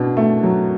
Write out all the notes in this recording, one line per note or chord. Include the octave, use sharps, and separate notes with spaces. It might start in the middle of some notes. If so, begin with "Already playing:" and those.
Already playing: B2 D4
A3
F#3